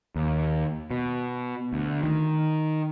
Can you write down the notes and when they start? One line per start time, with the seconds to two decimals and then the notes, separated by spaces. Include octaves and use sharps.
0.16 D#2
0.91 B2
1.73 D2
2.03 D#3